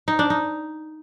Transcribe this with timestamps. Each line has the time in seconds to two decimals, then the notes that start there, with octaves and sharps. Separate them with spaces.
0.08 D#4
0.19 D4
0.30 D#4